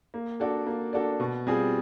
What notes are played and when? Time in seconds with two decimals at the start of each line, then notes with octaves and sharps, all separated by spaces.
0.14 A#3
0.40 D4 F#4 A4 D5
0.67 A#3
0.93 D4 F#4 A4 D5
1.20 B2
1.47 G3 C4 F4 G#4